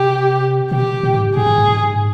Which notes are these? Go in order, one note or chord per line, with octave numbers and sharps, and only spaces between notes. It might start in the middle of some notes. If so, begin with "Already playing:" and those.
Already playing: C3 G4
B2 G4
A#2
G#2
G#2 G#4
G#2
G#2
G#2